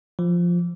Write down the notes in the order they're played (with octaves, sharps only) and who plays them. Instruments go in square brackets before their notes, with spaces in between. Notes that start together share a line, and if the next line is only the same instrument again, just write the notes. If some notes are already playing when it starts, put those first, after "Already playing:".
[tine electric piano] F3